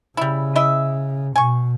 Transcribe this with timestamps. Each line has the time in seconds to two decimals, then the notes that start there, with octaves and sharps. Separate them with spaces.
0.17 C#3 G3 E4
0.56 E4 D#5 E5
1.36 B2 G#5 C#6